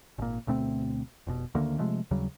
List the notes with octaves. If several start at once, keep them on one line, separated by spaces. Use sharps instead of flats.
G#1 A#2
D2 B2 A3 C4
F1 B2
D2 D3 D#3 A#3
C3 F3 G#3 A3
D#2 C#3 F#3 G3